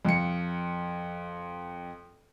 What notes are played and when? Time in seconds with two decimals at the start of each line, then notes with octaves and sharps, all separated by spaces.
0.05 F2 C#7